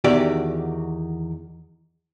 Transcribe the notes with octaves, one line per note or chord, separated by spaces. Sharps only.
E2 D#3 F#4 G4 D5